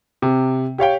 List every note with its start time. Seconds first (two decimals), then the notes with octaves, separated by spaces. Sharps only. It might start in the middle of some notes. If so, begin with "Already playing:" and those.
0.22 C3
0.78 G4 C#5 F5 G5